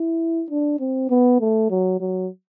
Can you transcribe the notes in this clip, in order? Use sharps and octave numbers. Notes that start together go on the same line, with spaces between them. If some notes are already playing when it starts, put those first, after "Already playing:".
Already playing: E4
D4
C4
B3
A3
F#3
F#3